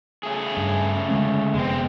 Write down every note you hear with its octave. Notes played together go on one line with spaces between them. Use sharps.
C#3 A3 G#4
G2
D3 G#3 C#4
F1 G#3 B3 C4